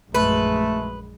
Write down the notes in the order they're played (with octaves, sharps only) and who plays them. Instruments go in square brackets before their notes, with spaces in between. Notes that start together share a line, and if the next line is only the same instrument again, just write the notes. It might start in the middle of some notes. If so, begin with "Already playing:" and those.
[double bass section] A#1 F#2 G#3 [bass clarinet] A3 [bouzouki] B4